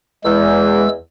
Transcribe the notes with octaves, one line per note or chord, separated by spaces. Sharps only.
E2 G#3 E6